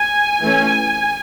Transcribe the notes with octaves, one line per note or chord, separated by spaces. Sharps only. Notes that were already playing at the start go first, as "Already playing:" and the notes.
Already playing: G#5
E3 A3 C#4